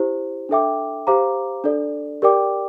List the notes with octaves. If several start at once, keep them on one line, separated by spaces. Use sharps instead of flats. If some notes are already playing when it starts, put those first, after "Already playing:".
Already playing: E4 G4 C5
D4 A4 E5 G5 D6
G4 C5 F5 A#5 D6
D4 A4 D5
G4 A#4 D5 G5 D6